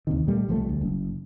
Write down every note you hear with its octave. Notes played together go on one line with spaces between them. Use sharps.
D#2 C3 D#3
A#2 G3 A3
C2 F3 G3 A3
D2
F#1